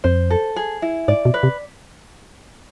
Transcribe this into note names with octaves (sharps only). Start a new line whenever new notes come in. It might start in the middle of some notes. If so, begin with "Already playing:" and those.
F2 C5
A4
G#4
E4
G#2 D5
B2
B4
C3